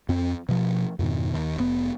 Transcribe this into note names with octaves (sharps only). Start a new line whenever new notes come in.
F2 C4
B2 F3
F2 G#2 B2 D#3
D#2
F1 A2 B3